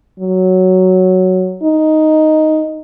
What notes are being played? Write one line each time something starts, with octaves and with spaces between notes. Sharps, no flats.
F#3
D#4